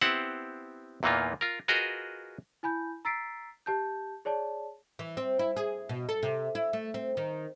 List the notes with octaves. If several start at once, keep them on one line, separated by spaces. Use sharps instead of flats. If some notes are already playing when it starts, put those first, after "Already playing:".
B3 C4 E4 G4 C5 F#5
E2 A#2 E3 A#3 D#4 F4
F4 A#4
F4 F#4 G#4 A#4 B4 D#5
E4 G#5 B5 G6
A#5 E6 A6 B6 C7 D7
G4 A5 G6
G#4 C#5 D5 A5
E3
C4
E4
G#4
B2
A4
C3
E4
A3
C4
D#3